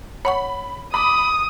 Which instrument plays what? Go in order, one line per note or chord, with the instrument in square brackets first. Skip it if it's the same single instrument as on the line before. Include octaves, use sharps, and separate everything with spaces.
[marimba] C#5 F#5 C#6 [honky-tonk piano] B5
[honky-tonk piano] B5 D6 [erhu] D#6